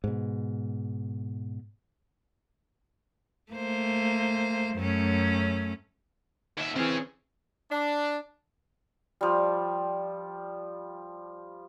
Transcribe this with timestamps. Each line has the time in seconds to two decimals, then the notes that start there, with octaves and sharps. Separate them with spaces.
0.04 G#2 B2
3.52 A3 A#3 C5
4.76 F#2 A3 C#4
6.58 D#2 E5
6.76 E3 C4 C#4 G#4
7.70 D4
9.21 F3 G3